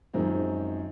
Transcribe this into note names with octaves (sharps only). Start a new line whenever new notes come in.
F#2 D#3 F3 G#3 C4 D#4